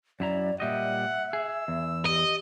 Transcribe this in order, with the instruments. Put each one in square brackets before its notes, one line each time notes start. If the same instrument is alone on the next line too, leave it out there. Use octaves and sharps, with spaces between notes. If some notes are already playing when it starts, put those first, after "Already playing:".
[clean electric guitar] F#2 E4 A#5 [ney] D5
[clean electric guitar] A#2 G3 D#5 [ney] E5 [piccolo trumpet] F#5
[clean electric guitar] G#4 [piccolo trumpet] E6
[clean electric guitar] E2
[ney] G4 [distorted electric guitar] D#5